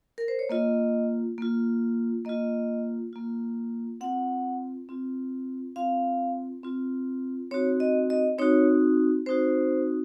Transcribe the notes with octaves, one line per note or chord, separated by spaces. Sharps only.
A#4
C5
C#5
A#3 F4 D#5
A#3 F4
A#3 F4 D#5
A#3 F4
C4 F4 F#5
C4 F4
C4 F4 F5
C4 F4
C4 D#4 F#4 C#5
D#5
D#5
C4 D#4 F#4 C#5
C4 D#4 F#4 C5